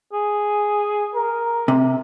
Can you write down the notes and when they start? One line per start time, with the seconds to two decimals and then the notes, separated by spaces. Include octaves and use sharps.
0.13 G#4
1.15 A#4
1.68 C3